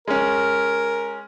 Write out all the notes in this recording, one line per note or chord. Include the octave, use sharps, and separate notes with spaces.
G#3 C#4 A#4